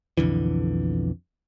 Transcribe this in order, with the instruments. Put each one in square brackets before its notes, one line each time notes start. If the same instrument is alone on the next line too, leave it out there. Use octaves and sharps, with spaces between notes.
[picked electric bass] B1 F2 D3 E3